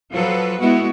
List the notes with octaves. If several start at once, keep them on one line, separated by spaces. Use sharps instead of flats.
F3 F#3 F4 A4 B4
G#3 B3 E4 F#4